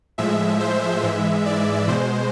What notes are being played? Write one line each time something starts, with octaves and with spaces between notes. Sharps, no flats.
A2 F3 G#3 E5
C5
G#2 E3 G#3 E5
D5
B2 G#3 C5